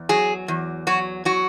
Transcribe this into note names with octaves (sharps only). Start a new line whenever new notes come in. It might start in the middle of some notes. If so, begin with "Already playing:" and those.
Already playing: E2
F#3 G#4
E2
F#3 F#4
F#3 F#4